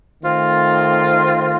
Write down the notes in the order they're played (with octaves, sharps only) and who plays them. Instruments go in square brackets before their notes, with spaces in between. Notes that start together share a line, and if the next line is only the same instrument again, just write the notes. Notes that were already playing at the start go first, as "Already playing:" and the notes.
[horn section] D#3 A3 C4 F4